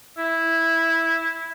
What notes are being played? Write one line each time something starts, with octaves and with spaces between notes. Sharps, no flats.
E4